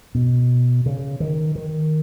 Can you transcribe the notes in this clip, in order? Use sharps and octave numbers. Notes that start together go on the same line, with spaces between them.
B2
C#3
D#3
D#3